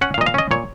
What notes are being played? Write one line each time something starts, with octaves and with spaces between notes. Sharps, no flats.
C#4 F#5
F5
A#2 D#5
F5
C#4 D#5
A#2 C#5